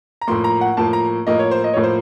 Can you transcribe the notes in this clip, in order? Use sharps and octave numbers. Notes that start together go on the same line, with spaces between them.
A#5
A2 F3 A#3 C6
A#5
F#5
A2 F3 A#3 A5
A#5
A2 F3 A#3 D#5
C#5
C5
D#5
A2 F3 A#3 C#5
C5